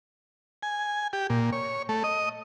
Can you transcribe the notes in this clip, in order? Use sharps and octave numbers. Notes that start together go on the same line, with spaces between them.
G#5
G4
A#2
C#5
A3
D#5